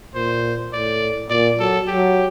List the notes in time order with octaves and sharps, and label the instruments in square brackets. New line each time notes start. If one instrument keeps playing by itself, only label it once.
[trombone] A#2 [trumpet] C5
[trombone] A2 [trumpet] D5
[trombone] A#2 [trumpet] D5
[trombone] F#3 [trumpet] A4
[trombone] F#3 [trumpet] G4